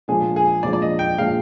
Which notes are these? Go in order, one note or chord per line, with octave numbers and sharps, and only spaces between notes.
A#2 F3 G#3 D4 G#4
G#4
A#2 F3 G#3 D4 D5
D5
D#5
G5
A#2 F3 G#3 D4 F5